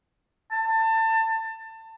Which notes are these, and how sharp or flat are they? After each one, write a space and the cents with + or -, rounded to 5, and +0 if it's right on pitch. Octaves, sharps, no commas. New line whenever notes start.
A5 +25